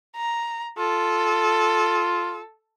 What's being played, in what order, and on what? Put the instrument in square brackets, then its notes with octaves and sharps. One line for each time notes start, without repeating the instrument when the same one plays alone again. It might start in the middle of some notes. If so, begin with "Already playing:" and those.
[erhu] A#5
[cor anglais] F4 [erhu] A4